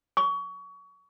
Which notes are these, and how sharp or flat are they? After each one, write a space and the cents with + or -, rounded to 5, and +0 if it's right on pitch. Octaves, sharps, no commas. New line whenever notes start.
C#6 +25